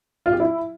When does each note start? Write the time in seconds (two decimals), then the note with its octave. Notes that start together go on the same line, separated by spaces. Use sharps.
0.26 F4
0.33 G4
0.40 E4